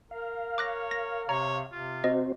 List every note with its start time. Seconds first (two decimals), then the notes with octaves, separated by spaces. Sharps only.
0.11 A#4 F5
0.58 C#5 D6 F#6 A#6
0.91 A#6
1.29 C3 C#5 A#5
1.72 C3 F4
2.04 C4 F#4 C5 D#5